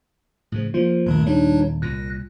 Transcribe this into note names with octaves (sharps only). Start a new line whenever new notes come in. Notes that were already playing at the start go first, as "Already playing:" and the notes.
A2 C#3 F3
F3 A#3
D#1 G2 D#3 A3
G3 D4 D#4 C#5
C2 A#2 F#6 A#6